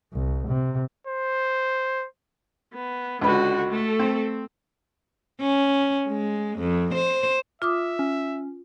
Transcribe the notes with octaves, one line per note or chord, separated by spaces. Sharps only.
C2
C3
C5
B3
C#2 D3 F#4 B4
A3 A4
C4
C#4
G#3
F2
C5
F4 E5 D6 D#6
C#4